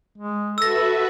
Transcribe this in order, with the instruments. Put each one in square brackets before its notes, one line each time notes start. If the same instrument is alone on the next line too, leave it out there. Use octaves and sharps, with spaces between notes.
[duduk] G#3
[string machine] F#4 B4 E5 [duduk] A4 [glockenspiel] E6 A#6